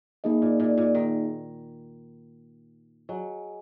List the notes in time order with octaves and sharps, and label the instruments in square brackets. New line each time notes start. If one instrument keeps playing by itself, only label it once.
[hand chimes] A#3 D#4 G#4 D#5
[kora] A#2
A#2
A#2
D#3
[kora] F#3 [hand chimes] G#4 D#5 G#5